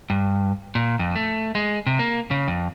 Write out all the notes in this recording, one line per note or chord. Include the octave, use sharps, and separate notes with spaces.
G2
A#2
F2
A3
G#3
C3
A#3
C#3
F2